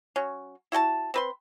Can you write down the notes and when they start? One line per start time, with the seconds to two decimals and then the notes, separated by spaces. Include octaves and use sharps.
0.16 F#3 C#4
0.72 E4 F#4 G5 A5
1.14 C4 B4 C6